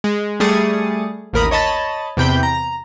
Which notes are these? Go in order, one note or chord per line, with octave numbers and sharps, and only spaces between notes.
G#3
G3 A3 G#4 D#6 A6 C#7
A1 D#2 A#4 B5 D#6
C#5 D#5 A5 B5 A6
E2 C3 G5 B5 G6
A#5